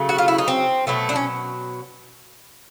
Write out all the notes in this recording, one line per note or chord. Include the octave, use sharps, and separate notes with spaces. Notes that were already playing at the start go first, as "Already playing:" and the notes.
Already playing: C#3 F#3 A3
F#4
F4
E4
D#4
C4
B2 F#3 A3
D4
C#4